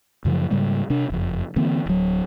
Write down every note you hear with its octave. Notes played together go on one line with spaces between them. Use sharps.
F#2 C#3 F3 F#3
G#2 C#3 G3 G#3
C3 D4
F#1 F2
D3 E3 A#3 C4
D1 F#3